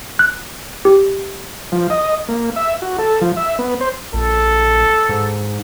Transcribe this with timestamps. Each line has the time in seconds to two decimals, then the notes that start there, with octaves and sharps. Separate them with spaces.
0.19 F#6
0.85 G4
1.72 F3
1.90 D#5
2.28 A#3
2.56 E5
2.82 F#4
2.99 A4
3.21 F3
3.37 E5
3.59 B3
3.81 C5
4.14 A#1 A4
5.09 G#2